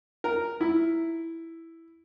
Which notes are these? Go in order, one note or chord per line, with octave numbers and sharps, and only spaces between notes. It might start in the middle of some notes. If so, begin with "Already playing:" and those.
A#4
E4